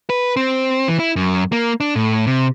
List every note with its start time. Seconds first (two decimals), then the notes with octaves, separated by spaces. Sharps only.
0.10 B4
0.37 C4
0.88 E3
1.00 E4
1.16 F#2
1.52 A#3
1.80 D4
1.96 A2
2.27 C3